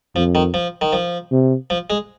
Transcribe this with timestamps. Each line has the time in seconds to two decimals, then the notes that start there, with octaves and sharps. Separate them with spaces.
0.16 F2 F3
0.35 D#3
0.54 F3
0.81 D#3
0.93 F3
1.32 C3
1.70 F3
1.90 G#3